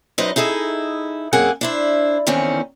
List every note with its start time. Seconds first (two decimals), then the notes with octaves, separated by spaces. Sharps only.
0.18 F#2 D#4 B4 C5 D#5
0.36 D#4 E4 G#4 A4 D#5
1.33 F#2 A#3 C4 G#4 F#5 G#5
1.61 D4 E4 C5
2.27 E2 D3 D#3 C4 C#4